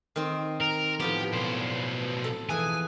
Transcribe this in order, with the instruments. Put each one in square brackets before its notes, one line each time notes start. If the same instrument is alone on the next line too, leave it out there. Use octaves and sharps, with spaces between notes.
[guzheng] D#3 C4
[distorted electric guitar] A#4
[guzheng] A2 F3 B3 [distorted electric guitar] G4
[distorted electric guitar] B1 C5
[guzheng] A4
[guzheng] F2 E3 G#4 [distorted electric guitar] G#5